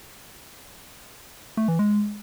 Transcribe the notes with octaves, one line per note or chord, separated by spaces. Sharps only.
A3
E3
G#3